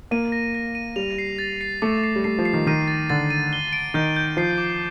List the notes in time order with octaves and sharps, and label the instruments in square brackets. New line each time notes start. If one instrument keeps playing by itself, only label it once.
[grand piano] A#3 [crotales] D#7
[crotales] A#6
A#6
D#7
[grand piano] G3 [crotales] F7
[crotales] C7
A6
C7
[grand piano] A3 [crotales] D6
[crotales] C7
[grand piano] G3
[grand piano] A3 [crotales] C7
[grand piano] F3
[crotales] C7
[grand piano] D#3
[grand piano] D#3 [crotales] D#7
[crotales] A6
[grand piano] D3 [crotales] A6
[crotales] D#7
G7
D7
[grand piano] D#3 [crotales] G6
[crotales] G6
[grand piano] F3 [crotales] C7
[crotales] D6